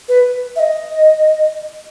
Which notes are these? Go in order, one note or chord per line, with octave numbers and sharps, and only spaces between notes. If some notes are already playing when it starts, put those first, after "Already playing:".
B4
E5
D#5